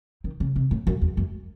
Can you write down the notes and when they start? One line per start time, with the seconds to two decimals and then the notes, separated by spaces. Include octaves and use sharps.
0.24 D#3
0.40 C#3
0.56 C3
0.71 A2
0.87 F#2
1.01 E2
1.17 F#2